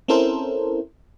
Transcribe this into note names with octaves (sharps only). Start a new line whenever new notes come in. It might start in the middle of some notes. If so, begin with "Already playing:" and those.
C4 C#4 E4 A4 A#4 C5